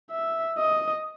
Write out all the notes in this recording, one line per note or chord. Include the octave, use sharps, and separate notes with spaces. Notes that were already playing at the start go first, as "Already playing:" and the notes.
E5
D#5